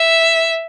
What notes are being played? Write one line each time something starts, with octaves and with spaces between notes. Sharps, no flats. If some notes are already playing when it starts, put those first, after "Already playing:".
Already playing: E5